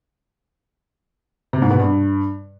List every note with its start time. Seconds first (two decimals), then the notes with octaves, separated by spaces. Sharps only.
1.53 C3
1.62 G#2
1.71 B2
1.79 G2